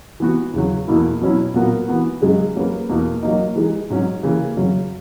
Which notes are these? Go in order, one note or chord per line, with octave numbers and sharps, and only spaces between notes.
E3 B3 F#4
E2 C#3 F#3
E2 B2 A#3 E4
B2 F#3 C#4 E4
A#2 F#3 B3 F#4 A#4
E3 B3 F#4
F#2 C#3 G#3 C#4 G#4
F#3 A#3 C#4 G#4 B4
E2 B2 A#3
F#3 A#3 D#4
E3 G#3 D#4 G#4
G#2 F#3 C#4
C#3 E3 A#3 E4
F#2 C#3 F#3 C#4